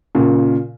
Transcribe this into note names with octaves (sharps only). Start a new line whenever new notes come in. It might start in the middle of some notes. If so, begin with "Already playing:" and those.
A#2 C#3